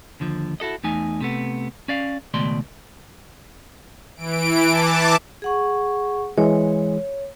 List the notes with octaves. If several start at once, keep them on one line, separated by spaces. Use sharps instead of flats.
D#2 D3 F3
E4 F#4 A4 D#5
E2 A3 D#4 G#5
C3 A3 B3
C#4 D5 F5
C#2 B2 D#3 A3 D5 C6
E3 D7
E3 A5 D6
G#4 F#5 C#6
E3 G#3 C#5